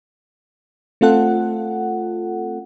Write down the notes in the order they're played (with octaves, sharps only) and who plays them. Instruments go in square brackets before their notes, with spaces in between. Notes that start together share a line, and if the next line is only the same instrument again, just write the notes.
[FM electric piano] A3 C4 F4 A4 F#5